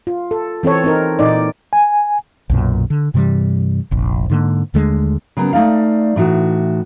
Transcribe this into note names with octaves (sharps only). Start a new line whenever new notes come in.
F4
A4
E3 C4 A4 C#5
C4 D#4 A#4
A#2 E3 D#4 D5
G#5
B1 F#2 A#2
D3
G2 C3 E3 G3
F1 A#1
G#2 D3 A#3
D#2 D3 G#3 A3
C#3 F#3 A#3 B3
A3 D#4 D5 F5
A2 E3 D#4 F#4